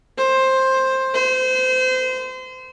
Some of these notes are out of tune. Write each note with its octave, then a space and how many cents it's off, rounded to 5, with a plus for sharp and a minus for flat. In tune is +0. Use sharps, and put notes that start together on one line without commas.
C5 +10
C5 -30